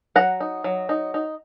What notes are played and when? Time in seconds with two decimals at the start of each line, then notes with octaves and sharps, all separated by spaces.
0.16 F#3 F#5 A#5
0.41 D#4
0.64 F#3
0.89 D#4
1.14 D#4